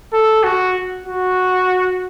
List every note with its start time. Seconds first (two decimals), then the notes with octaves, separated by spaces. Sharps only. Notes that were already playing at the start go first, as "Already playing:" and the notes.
0.13 A4
0.44 F#4
1.06 F#4